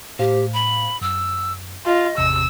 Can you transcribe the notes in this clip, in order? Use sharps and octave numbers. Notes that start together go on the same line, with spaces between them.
A2 G4 C5 F5
B5
F#2 E6
F4 D#5
G#1 E2 C3 E6